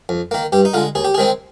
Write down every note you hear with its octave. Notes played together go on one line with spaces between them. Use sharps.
F2
D#3 A#3
G2 G4
D#4
D3 G#3 F4
D#2 G#4
G4
G#4
D#3 G#3 C4